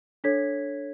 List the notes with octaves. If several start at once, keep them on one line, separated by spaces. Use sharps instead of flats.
D4 A4 C#5 G#6 B6